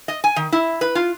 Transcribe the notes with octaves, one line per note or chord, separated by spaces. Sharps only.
D#5
G#5
D#3
E4
B4
F4